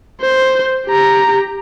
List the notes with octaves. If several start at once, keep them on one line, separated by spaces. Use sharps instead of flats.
C5
G4 A#5